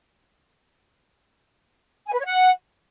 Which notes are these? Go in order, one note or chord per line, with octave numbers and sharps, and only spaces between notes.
G#5
B4
C#5
F#5